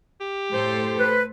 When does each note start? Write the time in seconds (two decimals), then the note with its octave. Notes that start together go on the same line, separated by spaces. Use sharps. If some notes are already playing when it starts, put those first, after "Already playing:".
0.21 G4
0.54 A2 A4 C5
0.98 B4